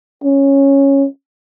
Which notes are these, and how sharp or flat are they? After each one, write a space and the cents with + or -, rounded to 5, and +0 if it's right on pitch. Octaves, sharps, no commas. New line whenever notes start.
C#4 -5